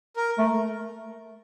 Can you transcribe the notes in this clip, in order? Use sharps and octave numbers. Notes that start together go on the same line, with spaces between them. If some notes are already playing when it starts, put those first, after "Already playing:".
A#4
A3